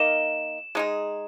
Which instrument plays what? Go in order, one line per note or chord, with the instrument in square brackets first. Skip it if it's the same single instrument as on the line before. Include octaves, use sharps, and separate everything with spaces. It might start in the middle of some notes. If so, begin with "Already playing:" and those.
Already playing: [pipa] A#3 D#4 A#4 D#5 [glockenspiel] E7
[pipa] G#3 D#4 G#4